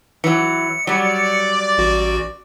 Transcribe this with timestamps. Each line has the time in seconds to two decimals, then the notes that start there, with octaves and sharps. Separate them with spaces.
0.24 E3 F#3 C#7
0.87 F#3 G3 D5
1.78 A1 F#4